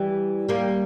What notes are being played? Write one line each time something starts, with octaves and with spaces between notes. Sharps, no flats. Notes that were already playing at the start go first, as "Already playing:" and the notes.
Already playing: E3 G3
G3 A#3